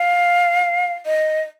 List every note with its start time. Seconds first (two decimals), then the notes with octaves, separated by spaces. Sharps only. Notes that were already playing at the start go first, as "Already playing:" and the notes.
Already playing: F5
1.06 D#5